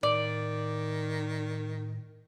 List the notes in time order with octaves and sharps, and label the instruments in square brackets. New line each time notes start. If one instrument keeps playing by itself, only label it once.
[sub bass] A2 [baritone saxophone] D#3 [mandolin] D5